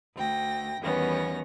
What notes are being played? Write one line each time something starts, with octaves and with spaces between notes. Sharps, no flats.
D2 G5 A#6
E2 D#3 G3 B3 C#4 A#6